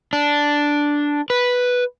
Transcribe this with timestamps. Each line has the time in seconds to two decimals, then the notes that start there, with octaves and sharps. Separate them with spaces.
0.13 D4
1.30 B4